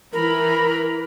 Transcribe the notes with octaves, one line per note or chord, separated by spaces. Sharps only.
E3 A#4 B5